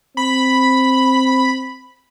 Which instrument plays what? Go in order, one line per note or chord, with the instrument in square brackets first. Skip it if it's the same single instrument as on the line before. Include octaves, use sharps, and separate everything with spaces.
[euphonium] C4 [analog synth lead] B5